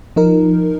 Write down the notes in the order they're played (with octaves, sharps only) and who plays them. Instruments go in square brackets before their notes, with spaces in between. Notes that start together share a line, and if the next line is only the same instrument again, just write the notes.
[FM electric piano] F3 D#4 A#4